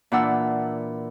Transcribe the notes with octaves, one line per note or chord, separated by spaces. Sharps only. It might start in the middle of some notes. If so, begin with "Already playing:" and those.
A#2 E3 D4 F#5 E6